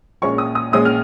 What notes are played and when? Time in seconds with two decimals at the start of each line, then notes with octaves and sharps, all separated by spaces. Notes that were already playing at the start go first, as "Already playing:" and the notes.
0.22 A#1 A#2 G#3 C#4 C#6
0.38 D#6
0.55 D#6
0.72 A#1 A#2 G#3 C#4 D#6
0.85 F6